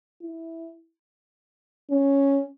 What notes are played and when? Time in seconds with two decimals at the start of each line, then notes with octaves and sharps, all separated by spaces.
0.21 E4
1.91 C#4